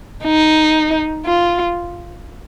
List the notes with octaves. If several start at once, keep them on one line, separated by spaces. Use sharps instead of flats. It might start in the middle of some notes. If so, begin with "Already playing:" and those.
D#4
F4